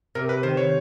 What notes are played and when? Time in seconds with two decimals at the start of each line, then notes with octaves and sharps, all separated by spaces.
0.15 C3 A#4
0.29 B4
0.43 D#3 C5
0.57 C#5